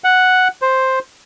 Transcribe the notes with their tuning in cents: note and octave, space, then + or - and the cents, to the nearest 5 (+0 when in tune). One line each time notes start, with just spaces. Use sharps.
F#5 +0
C5 +5